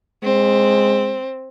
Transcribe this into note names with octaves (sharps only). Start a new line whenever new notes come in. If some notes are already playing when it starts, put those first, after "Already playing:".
G#3 C4